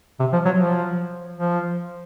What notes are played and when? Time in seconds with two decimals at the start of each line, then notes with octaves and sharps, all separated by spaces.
0.20 C3
0.33 F3
0.45 F#3
0.59 F3
1.36 F3